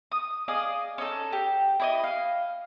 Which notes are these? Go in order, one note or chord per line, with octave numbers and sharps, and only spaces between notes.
D#6
G#4 D5 D#5 F5
C#4 D#4 A4
G4
E4 D5 D#5
F5